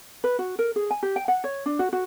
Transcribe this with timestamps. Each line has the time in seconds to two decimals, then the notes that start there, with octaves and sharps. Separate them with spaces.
0.24 B4
0.39 F#4
0.59 A#4
0.76 G#4
0.91 G#5
1.03 G4
1.16 G5
1.28 F#5
1.44 C#5
1.66 D4
1.79 F#4
1.93 F#4